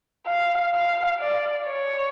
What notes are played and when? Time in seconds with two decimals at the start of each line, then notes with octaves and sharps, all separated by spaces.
0.27 F5
0.74 F5
1.19 D5
1.66 C#5